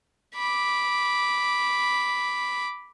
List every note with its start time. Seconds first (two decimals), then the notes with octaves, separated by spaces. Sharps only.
0.35 B5 D6